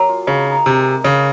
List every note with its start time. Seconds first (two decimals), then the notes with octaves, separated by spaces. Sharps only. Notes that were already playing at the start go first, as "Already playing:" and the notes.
Already playing: F#3 A#3 G#4
0.09 F4
0.27 C#3 G#3
0.47 D#4
0.66 C3 G#3
0.85 G#4
1.04 C#3 G#3